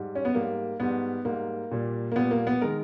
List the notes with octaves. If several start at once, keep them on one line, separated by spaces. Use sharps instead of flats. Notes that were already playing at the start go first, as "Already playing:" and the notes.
Already playing: G#2 G3
C#4
B3
G#2 G3 A#3
G#2 G3 B3
G#2 G3 A#3
A#2 G3
A#3
A#2 G3 B3
A#3
B3
D#3 G#3 A#4